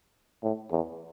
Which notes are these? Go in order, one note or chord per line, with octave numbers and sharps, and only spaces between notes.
A2
E2